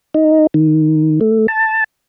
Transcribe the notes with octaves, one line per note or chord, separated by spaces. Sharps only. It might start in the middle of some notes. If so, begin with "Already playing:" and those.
D#4
D#3
A3
A5